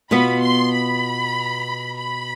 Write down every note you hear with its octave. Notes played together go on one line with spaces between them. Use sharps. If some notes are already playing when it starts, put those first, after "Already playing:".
B2 B3 F4 B5
C6
B5
B5